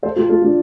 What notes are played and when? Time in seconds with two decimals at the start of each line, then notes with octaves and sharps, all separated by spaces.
0.03 A4 C5
0.16 F4 A4
0.29 F4 A4
0.42 D4 F4